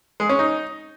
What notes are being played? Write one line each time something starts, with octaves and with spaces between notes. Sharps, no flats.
G#3
C#4
D#4